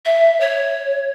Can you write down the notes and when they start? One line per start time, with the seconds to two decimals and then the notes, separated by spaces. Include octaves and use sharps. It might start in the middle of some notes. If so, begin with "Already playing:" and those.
0.05 E5
0.40 C#5